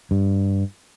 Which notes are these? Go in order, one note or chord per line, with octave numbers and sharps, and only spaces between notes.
G2